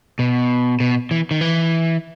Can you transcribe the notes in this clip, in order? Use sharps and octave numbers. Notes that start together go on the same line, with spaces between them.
B2
B2
E3
D#3
E3